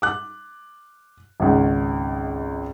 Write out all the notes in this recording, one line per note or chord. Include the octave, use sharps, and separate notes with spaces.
D6 F#6
G#1 C#2